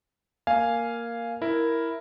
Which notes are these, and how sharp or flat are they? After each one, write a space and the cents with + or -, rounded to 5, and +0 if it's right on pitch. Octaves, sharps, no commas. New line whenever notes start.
A#3 +0 F5 -5 G#5 +0
E4 +0 A#4 +0